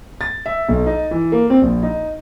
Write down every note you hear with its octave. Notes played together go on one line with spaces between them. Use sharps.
A6
E5
B1
D#4
E3
A#3
C4
A#1
D#4